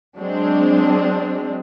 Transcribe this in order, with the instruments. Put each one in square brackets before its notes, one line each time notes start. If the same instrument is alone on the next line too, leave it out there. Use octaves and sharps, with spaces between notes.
[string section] F#3 G#3 C4 D4